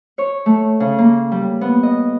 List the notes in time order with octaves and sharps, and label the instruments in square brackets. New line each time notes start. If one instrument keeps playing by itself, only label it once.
[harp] C#5
A3
C#3
A#3
G3
B3
D#5